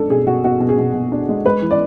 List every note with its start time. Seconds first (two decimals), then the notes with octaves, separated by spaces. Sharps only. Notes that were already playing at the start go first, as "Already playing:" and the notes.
Already playing: B2 G#3 D4 A4
0.10 B2 G#4
0.26 B2 F#4
0.44 B2 F#4
0.60 B2
0.69 G#4
0.78 B2
0.94 B2
1.12 D4
1.29 G#3
1.45 G#3 B4
1.62 E3
1.71 D5